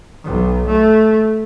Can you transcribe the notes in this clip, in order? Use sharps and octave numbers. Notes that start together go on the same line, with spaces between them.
B1
A3